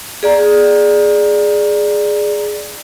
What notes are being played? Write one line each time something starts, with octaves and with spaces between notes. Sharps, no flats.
G#4 D5 A#5